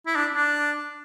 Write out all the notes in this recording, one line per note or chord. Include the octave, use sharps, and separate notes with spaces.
E4
D4
D4